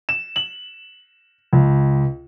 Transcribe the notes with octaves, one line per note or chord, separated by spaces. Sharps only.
E7
F#7
C#2